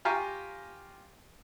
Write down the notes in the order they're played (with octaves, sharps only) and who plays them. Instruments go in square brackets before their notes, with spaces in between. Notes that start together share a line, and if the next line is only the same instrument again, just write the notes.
[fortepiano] F4 G4 F5 G#5 A#5 C#6